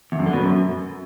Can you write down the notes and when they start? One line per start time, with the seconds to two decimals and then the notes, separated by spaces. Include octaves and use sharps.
0.12 E2
0.19 F#2
0.26 D3
0.33 B2
0.41 F#2